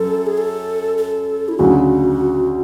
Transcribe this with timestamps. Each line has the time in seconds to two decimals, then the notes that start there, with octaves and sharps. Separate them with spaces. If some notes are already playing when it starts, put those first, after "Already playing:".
Already playing: F#2 A4
0.27 G#4
0.38 A4
0.98 A4
1.49 E4
1.58 D2 C#3 F#3 F#4